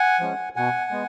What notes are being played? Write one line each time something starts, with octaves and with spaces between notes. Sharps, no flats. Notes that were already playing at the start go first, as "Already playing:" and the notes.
Already playing: F#5 G#5
F3 G#3 C#4
B2 F#5 G#5
G#3 B3